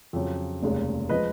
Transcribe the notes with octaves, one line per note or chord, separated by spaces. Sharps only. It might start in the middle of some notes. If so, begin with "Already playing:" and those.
F2 C#3 F#3
F1 D#2 C#3 G#3
F3 G#3 B4 D#5